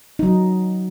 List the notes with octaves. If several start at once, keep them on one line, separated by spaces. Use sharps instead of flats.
F#3 D#4